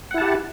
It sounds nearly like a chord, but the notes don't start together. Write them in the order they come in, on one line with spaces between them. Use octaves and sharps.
F#5 E4 A5 G4